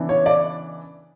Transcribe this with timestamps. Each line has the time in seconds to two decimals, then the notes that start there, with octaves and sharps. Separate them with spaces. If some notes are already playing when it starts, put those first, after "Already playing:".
Already playing: C#3 E3 B3 D4
0.09 C#5
0.26 D5